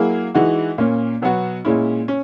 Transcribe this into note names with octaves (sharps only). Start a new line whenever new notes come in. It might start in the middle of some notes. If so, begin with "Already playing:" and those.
Already playing: F#3 A#3 E4 G#4
E3 G#3 D#4 F#4
A#2 A#3 C#4
B2 F#3 B3 F#4
A#2 G#3 C#4 E4
C#4